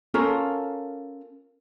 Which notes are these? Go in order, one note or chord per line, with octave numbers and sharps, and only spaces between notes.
C#4 F4 A4 A#4